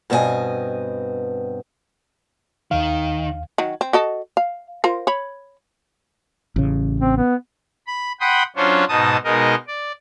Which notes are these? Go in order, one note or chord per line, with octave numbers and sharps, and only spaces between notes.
G2 B2 C4 D#4 D#5 G#5
D#2 D#3 F5
D#3 F#3
C4
F#4 A4 D#5
F5
F4 A#4 C5
C#5 B5
A1 C#3
C4
B3
B5
F#5 G5 B5 C6 D#6
F#3 C#4 D4 F4 C5 C#5
G#2 B2 D#4 A5 D#6
B2 G#3 D#4 A#4 D#5
D5